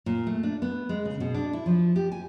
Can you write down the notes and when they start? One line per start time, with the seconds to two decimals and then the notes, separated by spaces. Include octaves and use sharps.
0.06 A#2
0.27 A3
0.43 D4
0.62 B3
0.89 G#3
1.05 C#3
1.20 B2
1.35 D4
1.53 E4
1.66 F3
1.96 G4
2.12 G#5